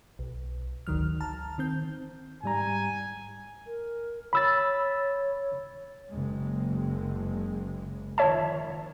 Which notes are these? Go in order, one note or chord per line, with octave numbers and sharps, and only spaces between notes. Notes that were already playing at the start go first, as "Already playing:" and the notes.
B1
G#1 D2 D#3 F#3 F6
A5 A#5 F6
D#3 C4 G6
G#2 G3 G#5 A#5
A#4
C#5 B5 E6 A6
F#1 G#3
D#3 F3 C#5 E5 A5